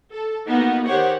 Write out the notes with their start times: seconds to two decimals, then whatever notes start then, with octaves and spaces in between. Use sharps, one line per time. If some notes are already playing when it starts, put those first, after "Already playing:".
0.12 A4
0.46 A#3 B3 D#4 F#4
0.86 D#3 G4 C5 C#5 F#5